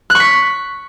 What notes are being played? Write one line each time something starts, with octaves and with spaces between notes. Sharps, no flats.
F#6
C#6
B6